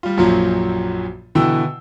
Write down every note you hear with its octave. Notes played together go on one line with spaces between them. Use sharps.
G3 F4
A#1 F#2 A#2 F3 F#3
B2 D3 E3 G5 E6